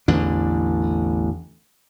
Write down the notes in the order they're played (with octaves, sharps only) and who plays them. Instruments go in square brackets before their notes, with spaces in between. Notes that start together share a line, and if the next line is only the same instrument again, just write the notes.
[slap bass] A1 E2 D3 D4